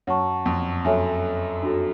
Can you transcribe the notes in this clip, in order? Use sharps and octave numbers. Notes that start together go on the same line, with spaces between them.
F#2 C#5 F#5 A5 C#6
F2
F#2 A4 C#5 E5 G#5
D4 F#4 A4